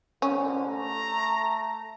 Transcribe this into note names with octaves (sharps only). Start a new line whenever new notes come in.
C2 F2 D3 C#4
A3 A#5